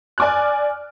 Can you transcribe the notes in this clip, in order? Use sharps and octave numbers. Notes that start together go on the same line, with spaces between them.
D5 G#5 D6 F6 F#6